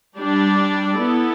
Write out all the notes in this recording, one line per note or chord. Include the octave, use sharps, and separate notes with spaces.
G3 D4 G4 D5
B3 E4 A4